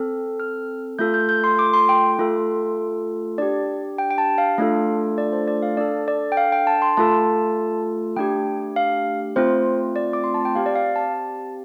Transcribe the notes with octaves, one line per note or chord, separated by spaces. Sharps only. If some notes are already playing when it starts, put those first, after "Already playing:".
Already playing: C4 A4
F6
A3 F4 A4 G6
G6
G6
C6
D6
C6
G5
A3 F4 A4
D4 G4 D5
G5
G5
A5
F5
A3 D4 F4 A4
D5
C5
D5
F5
D4 A4 D5
D5
G5
F5
G5
A5
C6
A3 F4 A4 A5
A3 D4 G4 G5
F5
A3 C4 F4 C5
D5
D6
C6
A5
G5
C4 G4 F5
D5
F5
A5